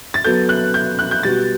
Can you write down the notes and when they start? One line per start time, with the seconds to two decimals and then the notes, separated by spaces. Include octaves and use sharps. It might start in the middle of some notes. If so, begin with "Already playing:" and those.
0.14 A6
0.24 F#3 B3 F#4 A4 G6
0.49 F#6
0.74 G6
0.99 F#6
1.11 G6
1.23 B2 G3 B3 F#4 A6